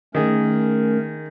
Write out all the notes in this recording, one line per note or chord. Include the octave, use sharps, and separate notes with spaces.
D#3 A3 C#4 G#4 A#4